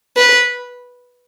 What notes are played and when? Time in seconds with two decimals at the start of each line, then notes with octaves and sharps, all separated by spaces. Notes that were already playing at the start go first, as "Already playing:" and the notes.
0.17 B4